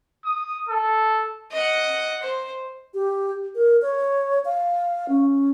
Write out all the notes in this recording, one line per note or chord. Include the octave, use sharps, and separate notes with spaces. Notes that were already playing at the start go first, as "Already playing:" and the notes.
D#6
A4
D#5 F#5
C5
G4
A#4
C#5
F5
C#4